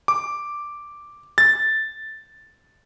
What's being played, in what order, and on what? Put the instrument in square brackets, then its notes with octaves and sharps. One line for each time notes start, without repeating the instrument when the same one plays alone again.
[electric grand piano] D6
A6